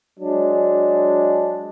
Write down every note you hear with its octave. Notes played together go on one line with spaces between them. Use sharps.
F#3 G#3 D4